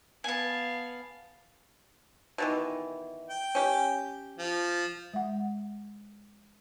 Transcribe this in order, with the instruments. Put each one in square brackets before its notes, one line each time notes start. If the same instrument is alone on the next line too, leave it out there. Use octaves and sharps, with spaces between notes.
[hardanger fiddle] B3 F5 [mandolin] G#5 A5
[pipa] B2 D#3 E3
[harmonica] G5
[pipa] C#4 G4
[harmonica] F3
[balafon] G#3 E5 F#5